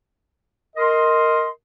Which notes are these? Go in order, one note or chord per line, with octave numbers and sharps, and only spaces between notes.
A#4 D#5 C6